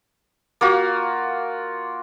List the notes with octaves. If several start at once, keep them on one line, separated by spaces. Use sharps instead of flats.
A#3 F4 F#4